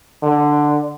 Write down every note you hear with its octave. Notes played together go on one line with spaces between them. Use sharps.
D3